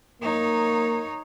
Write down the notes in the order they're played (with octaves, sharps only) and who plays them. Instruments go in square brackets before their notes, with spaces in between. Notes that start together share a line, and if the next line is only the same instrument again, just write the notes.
[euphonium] A#3 [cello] D#4 C#5